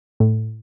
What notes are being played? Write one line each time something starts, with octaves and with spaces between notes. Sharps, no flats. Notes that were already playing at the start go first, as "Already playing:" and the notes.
A2